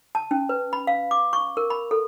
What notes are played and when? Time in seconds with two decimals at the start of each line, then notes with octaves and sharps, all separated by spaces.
0.15 A5
0.31 C#4
0.49 B4
0.73 B5
0.87 F5
1.11 D6
1.33 C#6
1.57 A#4
1.70 B5
1.91 A4